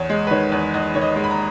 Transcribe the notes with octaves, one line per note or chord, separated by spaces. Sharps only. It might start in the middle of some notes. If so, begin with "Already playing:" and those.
Already playing: E2 C#5
G#3
B4
D#3 C#5
E2
E2 D#5
D#3 C#5
D#5
G#3
B5
A#5